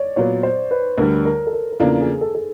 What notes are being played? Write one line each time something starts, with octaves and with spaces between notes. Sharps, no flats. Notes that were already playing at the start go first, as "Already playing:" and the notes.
Already playing: C#5 D5
A#2 F#3 B3 C#5
C5
B4
D2 D3 G3 A#4
A#4
A4
A#4
A#4
E2 C#3 F3 A#3 D4 A4
G#4
A4
A4